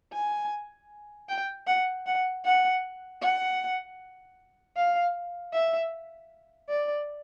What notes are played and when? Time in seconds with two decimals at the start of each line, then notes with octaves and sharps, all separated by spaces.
0.13 G#5
1.29 G5
1.67 F#5
2.06 F#5
2.45 F#5
3.22 F#5
4.76 F5
5.53 E5
6.69 D5